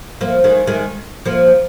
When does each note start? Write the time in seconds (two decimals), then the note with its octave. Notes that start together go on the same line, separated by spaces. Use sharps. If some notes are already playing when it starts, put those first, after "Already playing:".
0.21 F3 A#3
0.44 D#3 G#3
0.67 D#3 G#3
1.26 F3 A#3